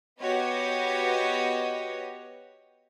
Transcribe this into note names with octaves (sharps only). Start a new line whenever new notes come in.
B3 F#4 G4 C#5 D#5